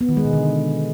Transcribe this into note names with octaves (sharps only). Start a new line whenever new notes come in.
B3
D#3
G#3
B2
D3